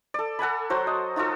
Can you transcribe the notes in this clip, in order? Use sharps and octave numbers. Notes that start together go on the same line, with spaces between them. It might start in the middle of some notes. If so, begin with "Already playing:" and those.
A4 D5
A4 F#5 G#5 B5
F#3 F#4 C5
D#5
D#4 F4 F#4 A4